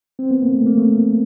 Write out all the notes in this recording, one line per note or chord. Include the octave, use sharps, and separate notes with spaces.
C4
B3
A#3
A3
A#3
A3